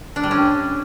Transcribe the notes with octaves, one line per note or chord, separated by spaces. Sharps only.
D4
G3
C#4